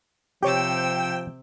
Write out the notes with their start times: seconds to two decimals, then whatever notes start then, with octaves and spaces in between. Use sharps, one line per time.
0.43 C3 F3 G4 C#5 G5 E6